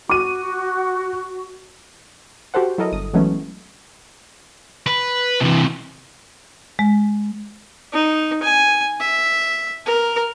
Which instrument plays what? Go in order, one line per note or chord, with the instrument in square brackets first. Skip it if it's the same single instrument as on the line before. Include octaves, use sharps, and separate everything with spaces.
[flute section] F#4 [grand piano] D6 D#7
[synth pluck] F#4 G4 A4 C5 F#5
F#3 E4 A4 A#4 D#5
G1 D#6
E3 F#3 G#3 A3 B3 C#4
[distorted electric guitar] B4
C3 E3
[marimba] G#3
[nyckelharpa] D#4
G#5
E5
A#4